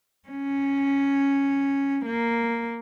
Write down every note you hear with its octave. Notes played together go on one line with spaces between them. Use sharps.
C#4
A#3